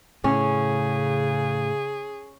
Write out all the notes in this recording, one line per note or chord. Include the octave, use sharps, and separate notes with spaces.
A2 C#3 C#4 G#4